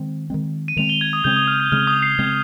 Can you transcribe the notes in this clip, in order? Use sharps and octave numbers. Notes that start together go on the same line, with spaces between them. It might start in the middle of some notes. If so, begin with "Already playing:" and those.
Already playing: D#3 G#3 C4
D#3 G#3 C4
D#7
D#3 G#3 C4 F7
G7
G#6
D#6
C#3 G#3 C4 G6
D#6
F6
G6
C#3 G#3 C4 F6
D#6
C7
C#3 G#3 C4 G#6